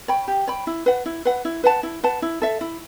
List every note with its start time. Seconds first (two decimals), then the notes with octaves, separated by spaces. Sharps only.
0.08 C#5 G5 B5
0.28 G4
0.47 C#5 G5 B5
0.67 E4
0.86 B4 F#5
1.06 E4
1.25 B4 F#5
1.45 E4
1.64 B4 F#5 A5
1.83 E4
2.03 B4 F#5 A5
2.22 E4
2.42 A4 E5
2.61 E4